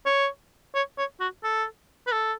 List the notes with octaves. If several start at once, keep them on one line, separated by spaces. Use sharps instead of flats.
C#5
C#5
C#5
F#4
A4
B4
A4